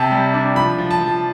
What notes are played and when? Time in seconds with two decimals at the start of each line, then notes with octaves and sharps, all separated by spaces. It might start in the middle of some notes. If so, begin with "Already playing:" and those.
Already playing: C3 A5
0.11 G3
0.34 D4
0.55 F3 B5
0.78 F3
0.91 A5
1.01 F3